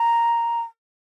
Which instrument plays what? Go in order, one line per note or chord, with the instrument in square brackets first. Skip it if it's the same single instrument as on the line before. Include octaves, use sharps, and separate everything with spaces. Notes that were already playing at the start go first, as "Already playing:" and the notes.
Already playing: [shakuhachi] A#5